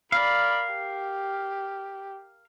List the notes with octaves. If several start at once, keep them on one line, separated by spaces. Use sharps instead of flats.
A#4 D5 F5 B5
G4